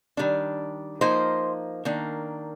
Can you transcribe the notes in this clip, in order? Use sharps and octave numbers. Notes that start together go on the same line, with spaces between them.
D#3 G3 D4
F3 A#3 D#4 C5
D#3 A#3 D4